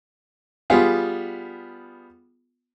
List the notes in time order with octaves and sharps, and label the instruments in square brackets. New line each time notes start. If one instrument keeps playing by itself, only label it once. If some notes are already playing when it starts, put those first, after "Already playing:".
[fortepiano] G3 B3 F4 G#4